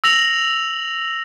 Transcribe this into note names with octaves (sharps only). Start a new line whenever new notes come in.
E6 A#6 F7 F#7